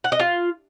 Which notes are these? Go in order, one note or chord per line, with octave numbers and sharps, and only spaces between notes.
F#5
D#5
F4